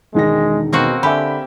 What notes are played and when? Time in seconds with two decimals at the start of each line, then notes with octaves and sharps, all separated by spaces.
0.14 E1 D#3 G#3 A#6
0.73 B2 A#3 C4 F#4
1.03 D3 G4 E5 G#5 B5